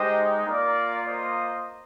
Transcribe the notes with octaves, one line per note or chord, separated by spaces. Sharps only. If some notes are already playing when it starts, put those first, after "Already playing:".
Already playing: G#3 D#4 G4 C5 D#5
A#3 F4 A#4 D5
C5 D#5